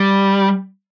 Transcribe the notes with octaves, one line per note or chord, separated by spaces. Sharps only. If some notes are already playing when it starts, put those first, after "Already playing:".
Already playing: G3